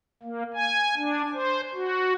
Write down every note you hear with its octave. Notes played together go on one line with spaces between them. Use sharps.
A#3
G#5
D4
C5
F#4